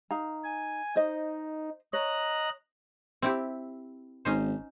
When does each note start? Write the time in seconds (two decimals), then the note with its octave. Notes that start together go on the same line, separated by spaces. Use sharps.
0.11 D#4 F5 A#5
0.44 G#5
0.96 D#4 C5 D#5
1.93 C#5 D#5 A#5 F#6
3.22 C4 E4 G4
4.25 G#1 C#4 D#4 C5